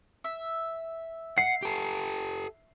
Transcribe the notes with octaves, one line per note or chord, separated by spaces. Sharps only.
E5
F#5 C7
G4 A4